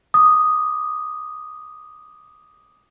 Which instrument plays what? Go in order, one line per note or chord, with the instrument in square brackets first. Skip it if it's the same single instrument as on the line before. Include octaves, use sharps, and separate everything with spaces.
[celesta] D6 D#6